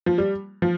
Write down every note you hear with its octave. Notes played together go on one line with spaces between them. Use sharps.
F3
G3
F3